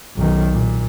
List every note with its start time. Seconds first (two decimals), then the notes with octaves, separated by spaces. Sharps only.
0.16 B1 D#3
0.53 A#2